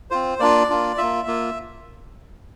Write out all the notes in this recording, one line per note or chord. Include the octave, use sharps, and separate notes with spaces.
C4 F4 C5
A#3 D4 F4 D5
A#3 D4 F4
A#3 F4 E5
A#3 F4